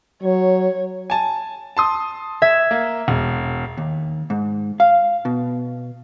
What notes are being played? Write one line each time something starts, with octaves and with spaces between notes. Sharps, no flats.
F#3 C#5
G#5 A5
A5 C6 D#6
E5 G#6
A#3
E1
D#2
G#2
F5
B2